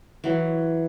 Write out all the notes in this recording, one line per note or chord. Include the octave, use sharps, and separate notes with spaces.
E3 F#3